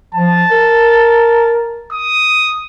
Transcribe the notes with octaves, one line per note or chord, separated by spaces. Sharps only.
F3 A5
A#4
D#6